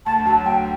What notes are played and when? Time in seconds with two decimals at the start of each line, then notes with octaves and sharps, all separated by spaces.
0.06 D2 A5
0.26 F#3 A5
0.46 D2 G5